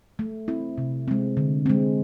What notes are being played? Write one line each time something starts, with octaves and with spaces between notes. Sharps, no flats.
A3
C4 E4
C3
G#3 C4
D3
G#3 C4